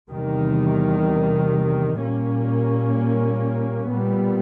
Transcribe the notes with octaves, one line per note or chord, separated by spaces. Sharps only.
E2 C3 D#3 G3
A#2 G3 A#3 C#4
A#2 G3 B3